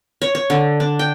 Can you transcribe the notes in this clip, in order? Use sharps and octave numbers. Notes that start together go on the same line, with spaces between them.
C#5
C#5
D3
D4
G5